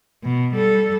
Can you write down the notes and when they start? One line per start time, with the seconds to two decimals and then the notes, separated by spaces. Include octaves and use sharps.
0.24 B2
0.55 G3 A4